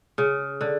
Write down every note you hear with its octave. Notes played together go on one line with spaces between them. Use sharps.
C#3
D3